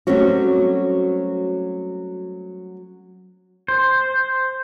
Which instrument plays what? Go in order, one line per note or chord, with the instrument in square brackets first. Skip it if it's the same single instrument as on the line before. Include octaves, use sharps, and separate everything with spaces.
[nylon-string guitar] F#3 G3 A3 C4 C#4 F#4
[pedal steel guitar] C5